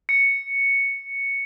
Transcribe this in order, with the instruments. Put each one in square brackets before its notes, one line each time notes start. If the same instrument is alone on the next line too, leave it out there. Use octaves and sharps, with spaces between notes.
[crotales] C#7